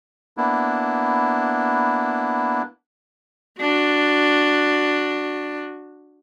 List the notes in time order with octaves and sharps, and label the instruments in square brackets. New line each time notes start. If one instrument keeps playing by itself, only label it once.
[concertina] A#3 B3 D4 E4
[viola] D4 F#4